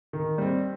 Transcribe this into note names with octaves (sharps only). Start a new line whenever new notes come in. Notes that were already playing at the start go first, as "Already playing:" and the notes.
D#3
G3 C4